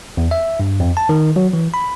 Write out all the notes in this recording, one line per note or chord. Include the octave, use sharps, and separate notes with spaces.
E2
E5
G2
F2
A5
D#3
F#3
E3
B5